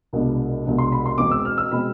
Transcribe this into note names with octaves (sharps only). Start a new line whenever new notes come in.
C2 B2 G#3 B3 D4
C2 B2 G#3 B3 D4
C6
B5
C6
E1 E2 B2 G#3 C4 D6
E6
F6
E6
B2 G#3 C4 B5